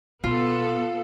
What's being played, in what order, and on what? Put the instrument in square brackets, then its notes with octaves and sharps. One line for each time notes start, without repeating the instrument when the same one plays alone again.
[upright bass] B2 [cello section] B3 A4 [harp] F4